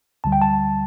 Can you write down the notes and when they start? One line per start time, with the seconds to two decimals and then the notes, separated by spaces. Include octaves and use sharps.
0.24 D2 D3 G3 A5
0.32 G5
0.41 A5